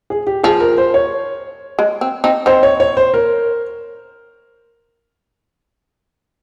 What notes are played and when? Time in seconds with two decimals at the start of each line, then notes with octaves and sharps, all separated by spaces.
0.10 G#4
0.27 G4
0.43 F3 G#4
0.60 A#4
0.78 C5
0.94 C#5
1.79 G#3
2.01 C4
2.24 C4 D#4
2.46 C4 D#4 C5
2.63 C#5
2.80 C#5
2.97 C5
3.14 A#4